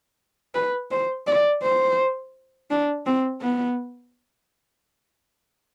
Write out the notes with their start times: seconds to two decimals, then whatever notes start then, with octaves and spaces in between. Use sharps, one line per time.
0.55 B4
0.91 C5
1.27 D5
1.63 C5
2.71 D4
3.06 C4
3.41 B3